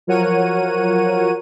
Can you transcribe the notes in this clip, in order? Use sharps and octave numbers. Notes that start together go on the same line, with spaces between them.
F3 F#3 A#4 C#5 F#5 D#7